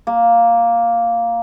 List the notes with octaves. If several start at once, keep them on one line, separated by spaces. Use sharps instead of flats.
A#3